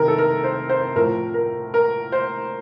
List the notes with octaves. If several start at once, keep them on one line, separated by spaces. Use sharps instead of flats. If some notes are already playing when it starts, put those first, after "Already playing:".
Already playing: C3 D#3 A#4
A4
A#4
C5
C5
A2 F3 A#4
A#4
A#4
C5